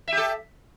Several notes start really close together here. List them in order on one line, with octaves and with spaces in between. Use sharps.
E5 G4 A4